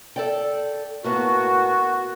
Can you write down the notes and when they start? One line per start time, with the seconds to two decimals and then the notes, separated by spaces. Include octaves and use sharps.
0.16 A4 D5 G5
1.04 A2 A#3 B3 F#4